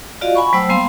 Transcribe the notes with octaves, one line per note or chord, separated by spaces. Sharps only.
F4 F#4 D5 D#5 F5
F#5 G#5 B5 C#6
F#3 A3 C5 F#5 G5 E6
G3 A#3 B3 F5 G#5 C6